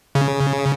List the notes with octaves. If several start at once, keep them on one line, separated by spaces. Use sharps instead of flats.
C#3